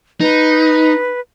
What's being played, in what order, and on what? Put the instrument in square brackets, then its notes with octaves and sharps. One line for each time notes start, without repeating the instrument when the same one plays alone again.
[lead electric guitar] D#4 [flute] B4